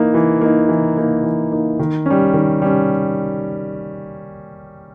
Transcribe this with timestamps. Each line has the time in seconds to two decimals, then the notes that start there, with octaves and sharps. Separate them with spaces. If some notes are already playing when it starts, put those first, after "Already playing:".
Already playing: E3 A#3 D#4
0.14 E3
0.41 A#3 D#4
0.69 E3
0.97 A#3 D#4
1.24 E3
1.52 A#3 D#4
1.79 D#3
2.06 G3 C#4
2.33 D#3
2.62 G3 C#4